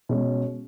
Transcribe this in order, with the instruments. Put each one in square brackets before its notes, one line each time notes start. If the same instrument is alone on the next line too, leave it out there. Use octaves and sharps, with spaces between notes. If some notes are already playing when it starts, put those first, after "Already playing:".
[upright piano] B2 G#3 C#4